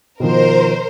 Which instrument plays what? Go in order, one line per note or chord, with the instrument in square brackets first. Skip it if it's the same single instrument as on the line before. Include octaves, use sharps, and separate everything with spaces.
[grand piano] B2 D#3 F3 [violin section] A#4 C5